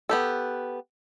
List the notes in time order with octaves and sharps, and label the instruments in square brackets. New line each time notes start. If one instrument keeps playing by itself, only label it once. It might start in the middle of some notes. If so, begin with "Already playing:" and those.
[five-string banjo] B3 G4 A4